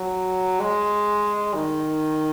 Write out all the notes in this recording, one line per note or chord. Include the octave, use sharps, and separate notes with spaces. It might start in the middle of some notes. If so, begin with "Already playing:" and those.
Already playing: F#3
G#3
D#3